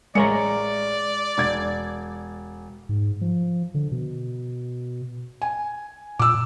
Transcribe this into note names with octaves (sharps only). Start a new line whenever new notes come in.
A1 G#3 A#4 C#5 D5 A#5 C#7
E1 G#6 A6
G#2
F3
D3
B2
G#5
A#2 D6 E6